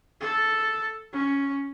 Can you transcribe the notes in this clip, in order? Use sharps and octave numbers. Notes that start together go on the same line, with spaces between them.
A4
C#4